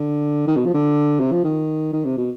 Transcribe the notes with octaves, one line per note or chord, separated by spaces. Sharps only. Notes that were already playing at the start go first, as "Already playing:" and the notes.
Already playing: D3
D#3
B2
F3
D3
C3
F3
D#3
D#3
C3
B2